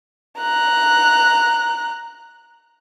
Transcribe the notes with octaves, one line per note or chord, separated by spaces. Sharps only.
A#5 F#6